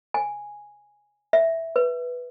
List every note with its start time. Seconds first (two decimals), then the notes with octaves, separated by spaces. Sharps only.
0.14 G#5
1.33 E5
1.76 B4